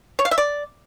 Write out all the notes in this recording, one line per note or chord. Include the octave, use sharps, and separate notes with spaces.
C#5
F5
E5
D5